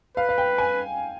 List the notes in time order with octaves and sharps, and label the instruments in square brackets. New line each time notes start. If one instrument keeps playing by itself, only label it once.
[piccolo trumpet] B4 [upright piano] F5
[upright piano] F5
G5
G#5